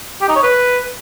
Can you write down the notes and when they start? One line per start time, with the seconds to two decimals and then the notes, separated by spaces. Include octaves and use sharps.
0.21 G4
0.29 D#4
0.36 C#5
0.43 B4